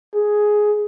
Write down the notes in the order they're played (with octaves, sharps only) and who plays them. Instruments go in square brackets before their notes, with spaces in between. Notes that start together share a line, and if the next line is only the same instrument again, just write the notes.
[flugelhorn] G#4